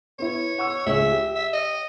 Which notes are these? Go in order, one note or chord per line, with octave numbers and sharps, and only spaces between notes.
B3 E4 C#5
F#5 C#6 E6
C#2 G#4 C#5 E5
G4
E5
D#5